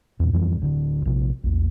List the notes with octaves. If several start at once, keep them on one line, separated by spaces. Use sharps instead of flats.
E2 A#2
F2 E3 F3 G3
D1 D2 D3
A#1 C3
A#1 E2